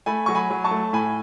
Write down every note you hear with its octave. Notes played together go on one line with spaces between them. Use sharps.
A3 G#5 B5
F#3 C#6
G#5 B5
F#3
A5 C#6
A3
A2 G#5 B5